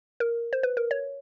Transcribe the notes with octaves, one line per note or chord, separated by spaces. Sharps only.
A#4
C5
B4
A#4
C#5